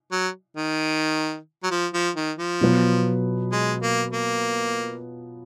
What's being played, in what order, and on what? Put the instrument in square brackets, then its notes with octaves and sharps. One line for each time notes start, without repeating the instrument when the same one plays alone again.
[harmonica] F#3
D#3
F#3
F3
F3
D#3
F3
[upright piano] B2 F#3 B3 F4 B4
[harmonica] G#3
A#3
A#3